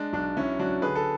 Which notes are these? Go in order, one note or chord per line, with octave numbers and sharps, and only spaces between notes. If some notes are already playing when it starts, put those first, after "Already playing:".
Already playing: G#3 D4
B1 D4
F#3 C#4 E4
F#3 D4 F#4
D3 G#4 B4
A4